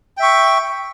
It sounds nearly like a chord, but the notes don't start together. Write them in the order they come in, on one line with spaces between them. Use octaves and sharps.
G5 E5 C#6